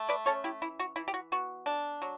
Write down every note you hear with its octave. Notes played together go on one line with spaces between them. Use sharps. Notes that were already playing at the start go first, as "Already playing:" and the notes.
Already playing: A3
B4 D5
C#4 A4 C#5
E4 G4
E3 E4
F#4
E3 E4
G4
F#4
B3 F#4
D4
F#3